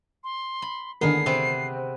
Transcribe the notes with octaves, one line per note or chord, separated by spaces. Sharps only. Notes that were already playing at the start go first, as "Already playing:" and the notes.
C6
B5
D3 D#3 B3 G#4 A#4 C7
C3 B3 C4